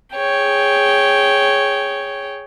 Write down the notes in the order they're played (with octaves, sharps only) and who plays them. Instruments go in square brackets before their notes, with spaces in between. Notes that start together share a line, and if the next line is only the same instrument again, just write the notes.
[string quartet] G#4 C#5 G5